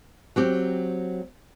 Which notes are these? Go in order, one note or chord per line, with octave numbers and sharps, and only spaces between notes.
F#3 C4 G4